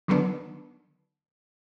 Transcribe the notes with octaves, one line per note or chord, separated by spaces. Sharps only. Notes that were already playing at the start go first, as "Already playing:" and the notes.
D3 D#3 F#3 B3 D4